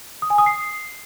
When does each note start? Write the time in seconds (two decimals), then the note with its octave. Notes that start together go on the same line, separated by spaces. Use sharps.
0.22 D#6
0.30 G#5
0.38 D#6
0.46 C7